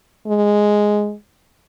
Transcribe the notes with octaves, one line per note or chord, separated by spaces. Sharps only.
G#3